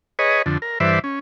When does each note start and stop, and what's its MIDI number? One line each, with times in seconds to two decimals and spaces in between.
0.19 0.42 68
0.19 0.42 71
0.19 0.42 73
0.19 0.42 75
0.46 0.58 41
0.46 0.58 50
0.62 0.78 70
0.80 0.99 43
0.80 0.99 52
0.80 0.99 71
0.80 0.99 72
0.80 0.99 74
0.80 0.99 76
1.04 1.19 61